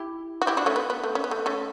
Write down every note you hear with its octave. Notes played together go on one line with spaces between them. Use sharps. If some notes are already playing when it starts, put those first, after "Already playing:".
Already playing: E4 G4
F#4
E4 G4
D4 F#4
A3 C#4
B3
B3
A3
C#4
B3
A3
A3 C#4